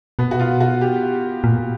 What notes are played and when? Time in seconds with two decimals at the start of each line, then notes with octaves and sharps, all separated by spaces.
0.19 B2 B3
0.31 F#4
0.39 F4
0.60 F#4
0.81 G4
1.44 A#2